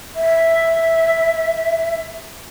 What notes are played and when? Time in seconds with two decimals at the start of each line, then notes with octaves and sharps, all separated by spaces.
0.15 E5